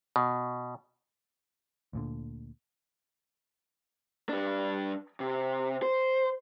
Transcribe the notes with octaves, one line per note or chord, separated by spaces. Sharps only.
B2
D2 A#2 D3
G2 D4
C3
C5